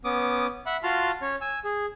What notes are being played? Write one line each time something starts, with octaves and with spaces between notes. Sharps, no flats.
B3 C#4 D6 D#6
E5 F#5 B5
F4 F#4 A5 C6 F6
C#4 C#5
G#5 E6
G#4